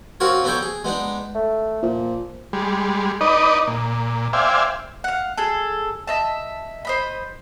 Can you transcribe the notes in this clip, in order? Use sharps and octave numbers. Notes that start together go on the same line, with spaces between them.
C4 C#4 F4 F#4 A#4 C#5
B3 D4 D#4 A4 C#5 G5
G#4
G#3 B3 D4 D#4
A3
A#2 F3
G3 G#3
D#4 B4 D5 D#5
A#2
C5 D5 E5 F5 G5 G#5
F5 F#5
G#4 A4
D#5 E5 A5
C5 D#5 B5